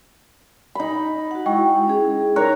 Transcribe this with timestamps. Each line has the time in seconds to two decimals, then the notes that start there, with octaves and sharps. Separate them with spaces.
0.75 D#4 B5
1.31 F#4 F#5
1.46 G#3 E4 D#5 G5 C#6
1.87 C#4 G#4
2.36 D#4 A#4 C#5 A#5 F#6